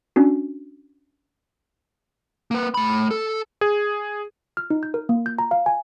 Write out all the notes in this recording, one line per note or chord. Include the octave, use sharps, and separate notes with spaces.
C#4 D4 F#4
A#3 B4
A3 B5
A4
G#4
F6
D#4
G6
A#4
A#3
G6
A#5
F5
G#5